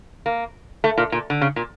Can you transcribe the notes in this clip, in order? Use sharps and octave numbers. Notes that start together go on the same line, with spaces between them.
A#3
A3
A#2
A#2
D3
C#3
A#2